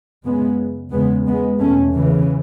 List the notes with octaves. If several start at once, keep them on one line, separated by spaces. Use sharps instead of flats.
F#2 C#3 G#3 B3
E2 C#3 G#3 B3
G#3 B3
E2 B2 A3 C#4
C#3 E3